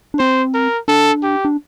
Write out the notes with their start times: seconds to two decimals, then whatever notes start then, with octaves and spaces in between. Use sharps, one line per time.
0.14 D4
0.19 C4 C5
0.54 A#4
0.88 D4 A4
1.23 G4
1.45 D4